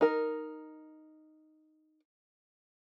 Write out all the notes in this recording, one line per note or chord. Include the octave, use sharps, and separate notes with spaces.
D#4 A#4